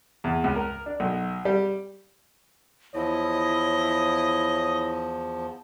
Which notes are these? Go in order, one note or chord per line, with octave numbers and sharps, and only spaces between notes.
E2
C#2
A#4
D4
B1
G3
E2 F3 E4 C#5 D#5